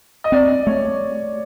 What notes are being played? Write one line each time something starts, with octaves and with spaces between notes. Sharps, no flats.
D#5
C4 D5
A3 C#5